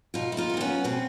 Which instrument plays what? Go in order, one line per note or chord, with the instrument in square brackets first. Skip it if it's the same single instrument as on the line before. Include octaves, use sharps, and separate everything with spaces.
[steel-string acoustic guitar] B2 D#4 F4
E4
D#4 F4
B3
G#3
C4
B3 C#4
B2 C4